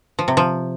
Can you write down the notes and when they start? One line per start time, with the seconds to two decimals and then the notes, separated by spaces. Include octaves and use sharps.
0.19 F3
0.28 C3
0.37 F3